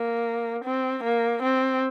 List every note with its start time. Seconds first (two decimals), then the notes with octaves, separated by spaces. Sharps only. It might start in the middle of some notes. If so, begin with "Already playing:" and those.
Already playing: A#3
0.64 C4
1.03 A#3
1.43 C4